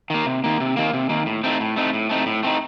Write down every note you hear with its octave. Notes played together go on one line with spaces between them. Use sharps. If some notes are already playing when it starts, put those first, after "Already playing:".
D#3 A#3
C3
D#3 A#3
C3
D#3 A#3
C3
D#3 A#3
A2
A3 C4 D#4
A2
A3 C4 D#4
A2
A3 C4 D#4
A2
A3 C4 D#4